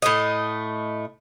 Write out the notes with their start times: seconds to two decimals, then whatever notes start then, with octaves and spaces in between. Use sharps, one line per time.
0.02 A2 A3 D#5